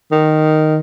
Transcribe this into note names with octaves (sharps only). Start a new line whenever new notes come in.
D#3